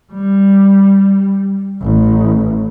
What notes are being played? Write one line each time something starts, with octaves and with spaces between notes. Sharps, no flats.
G3
A1